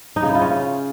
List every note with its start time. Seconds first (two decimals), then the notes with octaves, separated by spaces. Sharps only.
0.16 D#4
0.23 C#3
0.29 E4
0.35 F4
0.41 C#4